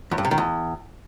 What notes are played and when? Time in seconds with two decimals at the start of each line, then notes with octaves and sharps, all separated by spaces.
0.11 E2
0.18 G2
0.25 C3
0.31 D#3
0.38 E2